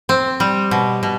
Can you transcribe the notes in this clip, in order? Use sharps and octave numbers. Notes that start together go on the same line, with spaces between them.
C4
G3
B2
B2